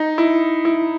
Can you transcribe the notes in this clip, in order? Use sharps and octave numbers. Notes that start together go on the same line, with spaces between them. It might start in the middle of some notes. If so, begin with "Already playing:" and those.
Already playing: D#4
E4
E4